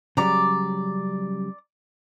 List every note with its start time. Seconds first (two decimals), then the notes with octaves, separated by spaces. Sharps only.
0.17 C#3 F#3 G3 D5 A#5 D6